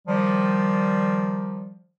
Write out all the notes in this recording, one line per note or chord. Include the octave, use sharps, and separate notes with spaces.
D#3 F3 G3